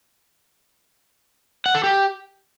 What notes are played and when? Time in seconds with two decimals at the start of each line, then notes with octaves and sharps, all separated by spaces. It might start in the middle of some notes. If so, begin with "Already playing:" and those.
1.66 F#5
1.75 A4
1.84 G4